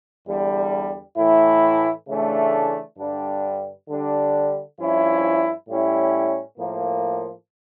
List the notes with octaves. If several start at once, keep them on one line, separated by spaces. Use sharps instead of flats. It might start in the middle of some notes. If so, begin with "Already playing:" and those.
E2 D3 G3
A2 E3 A3 E4
C#3 E3 A3 D4
G2 D3 G3 D4
D3 G3 D4
G2 F3 C#4 E4
A2 G3 C#4 E4
A2 F3 A#3